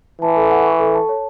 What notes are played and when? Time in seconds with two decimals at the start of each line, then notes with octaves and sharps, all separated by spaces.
0.22 E3 A5
0.36 A4
0.50 F#5
0.66 C#6
0.79 A4
0.95 A5
1.09 C#5